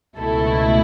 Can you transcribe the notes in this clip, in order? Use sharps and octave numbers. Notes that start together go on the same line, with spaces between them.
C#2 B2 A3 E4 A4